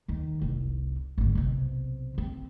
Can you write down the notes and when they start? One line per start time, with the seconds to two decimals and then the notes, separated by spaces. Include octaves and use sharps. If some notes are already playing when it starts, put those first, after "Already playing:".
0.08 D#2 D#3
0.42 F1 C2
1.18 G#1 D3
1.35 B1 C3
2.18 C4